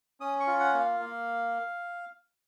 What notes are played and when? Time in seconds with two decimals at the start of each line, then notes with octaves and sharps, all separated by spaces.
0.20 C#4 D#6
0.40 C#6
0.47 F4
0.60 F#5
0.73 A#3
0.80 F5
1.00 A#3